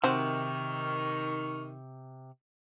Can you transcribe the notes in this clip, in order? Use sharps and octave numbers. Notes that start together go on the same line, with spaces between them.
C3 D#3 C4 F#4 C5 C#6 F6